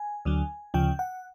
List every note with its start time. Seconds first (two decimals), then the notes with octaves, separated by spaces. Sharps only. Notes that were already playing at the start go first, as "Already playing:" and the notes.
Already playing: G#5
0.25 D2 D3 F#3
0.74 D2 C#3 F3 G5
0.99 F#5